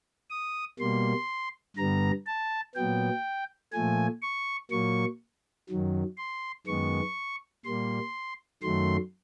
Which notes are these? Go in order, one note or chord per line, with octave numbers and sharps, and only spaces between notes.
D#6
B2 G3 A#3 C6
G2 D3 G3 B3 A#5
A5
A#2 F#3 B3 G5
A#2 F3 A3 G#5
C#6
A#2 F#3 A#3 C#6
F#2 D#3 F#3
C6
F#2 D#3 G#3 B3 C#6
A#2 G3 A#3 C6
F#2 D#3 F#3 A3 C6